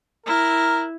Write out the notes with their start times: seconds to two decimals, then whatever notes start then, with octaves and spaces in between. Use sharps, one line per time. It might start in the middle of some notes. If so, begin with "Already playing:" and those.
0.26 E4 A#4